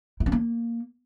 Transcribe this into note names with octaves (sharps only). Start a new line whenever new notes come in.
E4
C#4
A#3